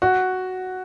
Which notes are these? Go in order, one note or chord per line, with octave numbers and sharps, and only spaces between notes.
F#4